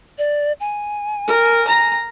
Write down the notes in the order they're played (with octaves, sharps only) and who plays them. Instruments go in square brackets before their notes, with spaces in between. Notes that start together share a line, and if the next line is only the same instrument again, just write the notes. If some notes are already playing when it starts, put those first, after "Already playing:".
[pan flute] D5
G#5
[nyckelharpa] A#4
A#5